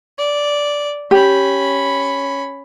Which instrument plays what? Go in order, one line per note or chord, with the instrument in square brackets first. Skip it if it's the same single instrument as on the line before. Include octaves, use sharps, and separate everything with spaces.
[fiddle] D5
[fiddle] C#4 B5 [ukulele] G4